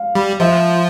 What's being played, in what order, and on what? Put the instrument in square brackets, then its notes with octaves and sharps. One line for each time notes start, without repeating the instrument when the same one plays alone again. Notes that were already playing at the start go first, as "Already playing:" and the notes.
Already playing: [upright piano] F5
[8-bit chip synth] G3
[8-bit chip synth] F3 [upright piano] E5